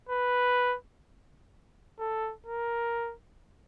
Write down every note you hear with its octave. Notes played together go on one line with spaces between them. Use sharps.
B4
A4
A#4